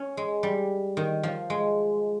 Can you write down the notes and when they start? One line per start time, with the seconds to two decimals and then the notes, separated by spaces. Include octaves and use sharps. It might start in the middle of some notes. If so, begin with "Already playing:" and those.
Already playing: C#4
0.17 G#3
0.43 G3
0.97 D#3
1.23 F3
1.50 G#3